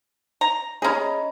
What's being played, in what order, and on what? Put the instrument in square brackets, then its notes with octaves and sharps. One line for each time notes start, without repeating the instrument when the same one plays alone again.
[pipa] A#5
[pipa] C#4 G#4 [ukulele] D#5 A#5 B5